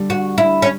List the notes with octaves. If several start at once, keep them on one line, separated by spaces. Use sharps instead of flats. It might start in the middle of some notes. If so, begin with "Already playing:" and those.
Already playing: D3 G3
F#4
E4
C#4